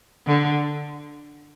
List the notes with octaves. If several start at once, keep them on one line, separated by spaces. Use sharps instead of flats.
D3